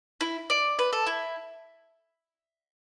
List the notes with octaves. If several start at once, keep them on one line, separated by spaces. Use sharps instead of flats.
E4
D5
B4
A4
E4